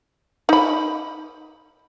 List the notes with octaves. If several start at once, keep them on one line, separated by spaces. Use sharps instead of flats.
D#4 B5